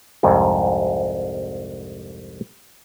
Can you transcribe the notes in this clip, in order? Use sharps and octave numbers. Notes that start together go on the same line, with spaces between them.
C2 F2 G#2